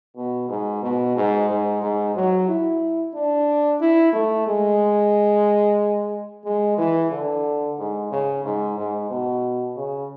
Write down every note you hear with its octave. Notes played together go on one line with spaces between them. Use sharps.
B2
G#2
B2
G#2
G#2
G#2
F#3
E4
D4
E4
A3
G#3
G#3
E3
D3
G#2
C#3
G#2
G#2
B2
C#3